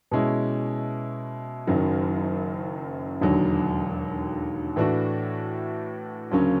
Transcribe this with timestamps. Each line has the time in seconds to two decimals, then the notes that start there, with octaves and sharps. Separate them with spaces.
0.11 B2 G#3 C#4 E4
1.67 F#1 F#2 D#3 F#3
3.21 E1 D#2 D3 F#3
4.76 A2 E3 A3 D4 F#4
6.31 D2 C#3 F#3 A#3 C#4